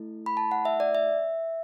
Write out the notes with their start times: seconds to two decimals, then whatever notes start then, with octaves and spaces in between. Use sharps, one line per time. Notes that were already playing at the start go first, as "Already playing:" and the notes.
Already playing: A3 E4 A4
0.26 B5
0.37 A5
0.51 F#5
0.65 E5
0.80 D5
0.95 E5